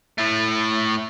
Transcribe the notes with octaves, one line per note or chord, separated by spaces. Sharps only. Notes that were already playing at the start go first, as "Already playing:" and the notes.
A2 A3